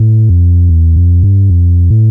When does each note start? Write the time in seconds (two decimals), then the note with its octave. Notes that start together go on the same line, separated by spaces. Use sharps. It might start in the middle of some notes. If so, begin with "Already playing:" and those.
Already playing: A2
0.29 F2
0.69 E2
0.96 F2
1.23 G2
1.50 F2
1.90 A2